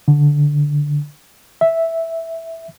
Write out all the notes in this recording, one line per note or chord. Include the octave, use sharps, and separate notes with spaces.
D3
E5